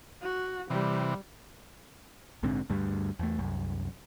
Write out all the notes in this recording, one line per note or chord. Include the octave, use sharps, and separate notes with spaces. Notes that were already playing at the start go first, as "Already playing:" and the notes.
F#4
C3 E3 G3
A#1 G#2 D3 C4
D2 G2 G3
E2 A3
C2 F#2